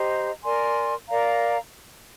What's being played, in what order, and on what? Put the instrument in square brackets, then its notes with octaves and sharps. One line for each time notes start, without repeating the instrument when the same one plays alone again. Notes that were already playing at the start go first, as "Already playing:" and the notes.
Already playing: [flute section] G4 C5 D#5 A#5
A#4 D5 G#5 C6
A#4 D5 F5 A#5